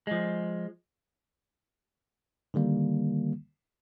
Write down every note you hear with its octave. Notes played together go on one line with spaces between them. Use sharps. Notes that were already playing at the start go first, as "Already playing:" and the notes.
F3 G#3
D3 D#3 G3 A#3